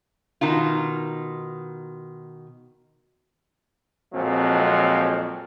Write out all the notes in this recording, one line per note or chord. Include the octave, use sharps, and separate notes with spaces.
B2 D#3 D#4 F4
F2 A#2 F3 F#3 G#3 C4